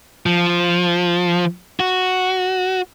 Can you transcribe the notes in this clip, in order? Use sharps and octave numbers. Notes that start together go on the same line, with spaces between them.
F3
F#4